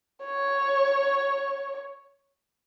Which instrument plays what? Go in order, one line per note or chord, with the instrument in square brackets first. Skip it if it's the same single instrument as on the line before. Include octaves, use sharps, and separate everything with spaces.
[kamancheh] C#5